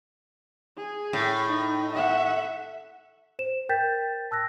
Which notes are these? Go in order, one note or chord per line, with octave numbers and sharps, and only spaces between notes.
G#4
A2
D#4
E5 F#5
C5 E7
A#4 G5 G6 A6 B6
A5 E6 F#6 A#6